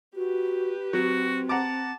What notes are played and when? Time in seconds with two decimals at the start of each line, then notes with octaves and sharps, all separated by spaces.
0.16 F#4 G4 B4
0.93 F#3 C4 F#4
1.49 F#5 A5 A#5 D6